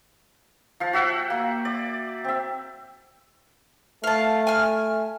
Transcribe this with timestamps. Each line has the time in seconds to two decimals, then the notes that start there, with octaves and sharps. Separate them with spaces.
0.80 F3 F5
0.93 F#4 E5 F#5 G5
1.30 A#3
1.65 D5
2.24 C4 E5
4.04 A3 F5 A5
4.47 G#5 F6